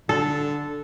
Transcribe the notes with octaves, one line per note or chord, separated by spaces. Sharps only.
D3 A4